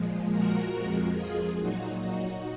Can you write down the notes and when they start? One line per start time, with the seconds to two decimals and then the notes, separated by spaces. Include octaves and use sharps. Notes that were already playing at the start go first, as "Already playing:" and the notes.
Already playing: A#2 F3 G#3
0.32 F#4 A#4
0.75 F2 F3 G#3
1.16 F4 G#4
1.59 A#2 F#3 D#4 F#4
2.02 D#4 F#4